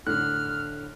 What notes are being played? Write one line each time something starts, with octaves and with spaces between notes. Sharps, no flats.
A2 D3 F6 F#6